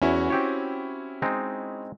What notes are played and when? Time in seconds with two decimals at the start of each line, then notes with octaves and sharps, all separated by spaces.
0.02 E2 C#4 E4 F#4
0.30 C4 G4 C#5
1.22 G#3 C4 D#4